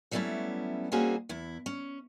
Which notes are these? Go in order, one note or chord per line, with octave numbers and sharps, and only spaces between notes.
F#3 G3 A3 B3 C#4 E4
G3 A#3 C4 C#4 F#4 G#4
E2 E4
C#4